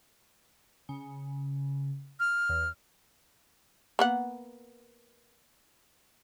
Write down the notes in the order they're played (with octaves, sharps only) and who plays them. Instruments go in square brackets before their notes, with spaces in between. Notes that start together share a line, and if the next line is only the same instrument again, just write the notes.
[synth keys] C#3
[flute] F6
[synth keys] E2
[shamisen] A#3 B3 F#5